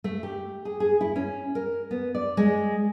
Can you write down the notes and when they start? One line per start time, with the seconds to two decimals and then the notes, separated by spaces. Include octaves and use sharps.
0.04 A3
0.23 G4
0.65 G#4
0.80 G#4
1.01 E4
1.16 C#4
1.55 A#4
1.91 B3
2.15 D5
2.37 G#3